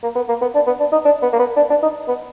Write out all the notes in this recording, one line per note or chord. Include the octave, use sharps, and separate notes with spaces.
A#3
B3
A#3
B3
D4
B3
D4
D#4
D4
B3
A#3
B3
D4
D4
D#4
B3